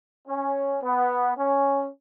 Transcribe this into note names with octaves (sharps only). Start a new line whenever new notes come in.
C#4
B3
C#4